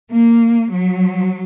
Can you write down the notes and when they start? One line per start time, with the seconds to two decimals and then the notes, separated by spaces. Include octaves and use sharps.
0.11 A#3
0.72 F#3